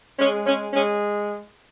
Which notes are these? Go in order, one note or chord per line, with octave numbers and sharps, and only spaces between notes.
G#3 C#4
G#3 C#4
G#3 C#4